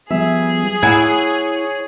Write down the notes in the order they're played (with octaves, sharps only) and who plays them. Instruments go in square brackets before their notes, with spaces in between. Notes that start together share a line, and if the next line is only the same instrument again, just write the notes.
[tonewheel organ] F3 G3 B3 [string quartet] G#4 [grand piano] E5
[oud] E4 [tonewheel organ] C#5 [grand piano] F#5 G#5 G#6